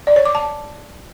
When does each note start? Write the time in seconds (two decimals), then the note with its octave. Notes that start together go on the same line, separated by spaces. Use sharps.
0.07 D5
0.16 C#5
0.25 D6
0.35 A5